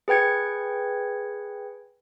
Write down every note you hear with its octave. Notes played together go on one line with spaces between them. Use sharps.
G#4 B4 G5 G#6 C#7